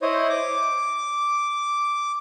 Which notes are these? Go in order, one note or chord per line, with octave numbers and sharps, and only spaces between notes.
E4 C5 C#5 D#5
D6